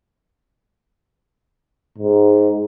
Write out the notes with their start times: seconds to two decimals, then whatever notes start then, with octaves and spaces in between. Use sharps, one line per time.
1.98 G#2